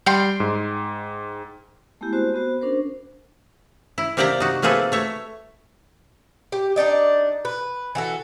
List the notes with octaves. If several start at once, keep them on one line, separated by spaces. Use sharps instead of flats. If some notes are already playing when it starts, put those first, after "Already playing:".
G3 G5 C6
G#2
G#3 A3 B3 E4 G4
C4 F#4 C5
B3 F#4 C5
C#4 D4 A#4 C5
E4
C3 A#3 G4 D5 E5 A#5
D#4 F#4
A3 A#3 C4 G#4 A4 B4
A3 C#5 E5
G4
D4 D#4 D5 D#5
B4
E3 F#4 A4